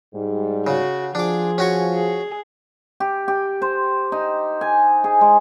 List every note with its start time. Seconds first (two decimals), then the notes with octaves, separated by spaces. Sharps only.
0.14 G#2 G3
0.67 C#3 F#4
1.15 F3 D4 G#4 D6
1.58 C#4 F#4 C#6
1.94 G#4
3.00 G4
3.28 G4
3.62 C5
4.12 D#4
4.61 G#5
5.04 G#4
5.21 G#3